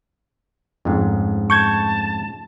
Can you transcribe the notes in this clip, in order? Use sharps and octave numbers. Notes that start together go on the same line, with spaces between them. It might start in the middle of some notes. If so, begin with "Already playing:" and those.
F2 G#2 G#3 A3 C#4
A5 C#6 G6 G#6